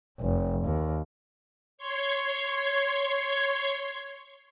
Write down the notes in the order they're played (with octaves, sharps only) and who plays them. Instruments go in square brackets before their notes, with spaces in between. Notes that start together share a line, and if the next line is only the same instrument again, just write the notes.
[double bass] F1
D#2
[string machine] C#5 C6 G#6